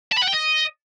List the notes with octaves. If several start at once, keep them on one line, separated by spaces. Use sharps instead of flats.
A5
B5
F#5
G5
D#5